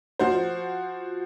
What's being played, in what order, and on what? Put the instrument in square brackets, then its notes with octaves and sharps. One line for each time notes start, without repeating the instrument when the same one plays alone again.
[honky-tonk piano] F3 F#4 C5